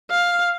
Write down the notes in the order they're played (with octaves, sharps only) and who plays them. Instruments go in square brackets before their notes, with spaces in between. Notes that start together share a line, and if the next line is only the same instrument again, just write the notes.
[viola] F5